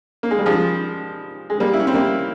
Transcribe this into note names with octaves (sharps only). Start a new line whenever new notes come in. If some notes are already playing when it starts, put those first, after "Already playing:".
A#3
G#3
G3
F3 G#3
G#3
G3 A#3
E4
C#4
C4
G3 A#3